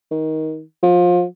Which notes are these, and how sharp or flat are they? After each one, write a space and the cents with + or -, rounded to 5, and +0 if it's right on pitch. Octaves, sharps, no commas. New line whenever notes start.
D#3 +15
F3 +25